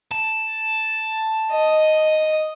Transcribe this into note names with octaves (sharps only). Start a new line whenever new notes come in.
A5
D#5